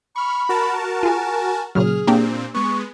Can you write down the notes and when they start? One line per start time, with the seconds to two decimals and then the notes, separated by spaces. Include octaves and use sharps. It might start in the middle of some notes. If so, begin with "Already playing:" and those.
0.16 B5 C#6 F6
0.49 F#4 A#4 A5
1.03 F4 G#4 G#5
1.75 A#2 C#3 F#3 G#4 F6
2.07 A#2 A#3 C4 D4 G4
2.54 G#3 B3 C#6